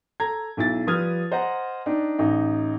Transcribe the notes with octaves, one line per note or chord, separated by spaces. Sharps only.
A4 A#5 G#6
B1 E4 A6
F3 G3 B4 D#6 F6 G#6
C5 D#5 F#5 A#5
C4 D4 D#4
A1 D#4